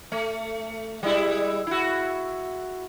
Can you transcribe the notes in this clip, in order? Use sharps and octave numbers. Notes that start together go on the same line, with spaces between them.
A3
G3 G#3 E4
E4 F#4